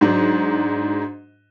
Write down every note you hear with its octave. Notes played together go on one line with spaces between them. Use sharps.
G#2 F#3 D4